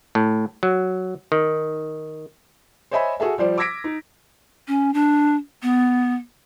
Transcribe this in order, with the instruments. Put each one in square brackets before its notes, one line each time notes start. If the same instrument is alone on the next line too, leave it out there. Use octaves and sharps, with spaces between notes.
[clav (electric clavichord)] A2
F#3
D#3
[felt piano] C5 C#5 D#5 E5 G#5 B5
F#4 G#4 A4 E5
F3 G3 C5 D5
D6 E6 G#6 A#6 B6 D7
D#4
[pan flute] C#4
D4
B3